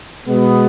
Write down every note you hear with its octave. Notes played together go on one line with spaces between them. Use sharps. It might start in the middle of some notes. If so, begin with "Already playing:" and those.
B2 G#3 B3